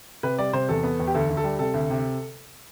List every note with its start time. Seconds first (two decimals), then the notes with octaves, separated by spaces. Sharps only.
0.23 C3 B4
0.38 G3 D5
0.53 C3 C5
0.69 E2 A4
0.83 B3
1.00 E2
1.07 G4
1.14 D2 A4
1.30 D2
1.37 A4
1.44 G3
1.59 C3 A4
1.74 D2
1.90 C3